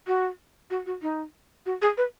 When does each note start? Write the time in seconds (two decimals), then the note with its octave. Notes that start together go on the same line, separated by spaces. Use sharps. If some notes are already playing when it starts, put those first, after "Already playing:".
0.07 F#4
0.70 F#4
0.86 F#4
1.02 D#4
1.66 F#4
1.82 G#4
1.97 B4